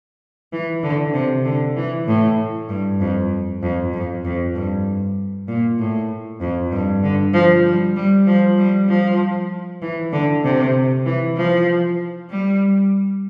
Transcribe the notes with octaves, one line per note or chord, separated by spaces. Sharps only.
E3
D3
C3
D3
E3
A2
G2
F2
F2
F2
F2
G2
A#2
A2
F2
G2
D3
F3
G3
G3
F3
G3
F3
E3
D3
C3
E3
F3
G3